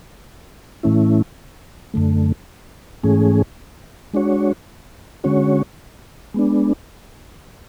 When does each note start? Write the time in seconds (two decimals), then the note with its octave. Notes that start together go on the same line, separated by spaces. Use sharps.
0.83 A2 E3 A3 C#4 E4
1.94 F#2 D3 A3
3.03 G#2 E3 A3 C#4 G#4
4.13 G#3 D4 F#4 C#5
5.24 D3 G#3 C#4 F#4 C#5
6.34 G#3 B3 D4